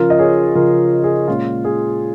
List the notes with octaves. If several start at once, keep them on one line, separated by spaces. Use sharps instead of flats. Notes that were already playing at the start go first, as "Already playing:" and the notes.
Already playing: C#3 F3 C#4 F4 A#4
D#5
G#4 C#5
C#3 F3 C#4 F4 A#4
G#4
A#2 G#3 C#4 F4
G#4